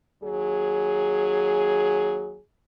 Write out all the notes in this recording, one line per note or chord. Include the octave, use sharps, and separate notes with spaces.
D#2 F#3 G#4